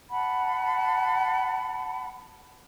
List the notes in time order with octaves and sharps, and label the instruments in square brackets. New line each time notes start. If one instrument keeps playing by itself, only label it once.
[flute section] F#5 A5 B5